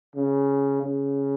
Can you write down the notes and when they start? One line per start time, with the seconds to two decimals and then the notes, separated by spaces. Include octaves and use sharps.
0.15 C#3
0.82 C#3